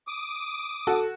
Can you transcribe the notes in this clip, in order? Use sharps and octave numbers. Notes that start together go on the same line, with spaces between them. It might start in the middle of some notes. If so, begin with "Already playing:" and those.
D6 D#6
F#4 A4